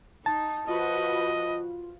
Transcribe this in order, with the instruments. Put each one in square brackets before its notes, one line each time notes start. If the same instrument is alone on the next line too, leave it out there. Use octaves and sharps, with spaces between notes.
[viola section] D#4 [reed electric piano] A5
[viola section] F3 F#4 B4 [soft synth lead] F4 [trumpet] D#5